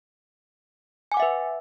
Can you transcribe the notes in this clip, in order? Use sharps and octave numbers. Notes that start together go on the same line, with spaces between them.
B4 E5 F#5 G#5 D6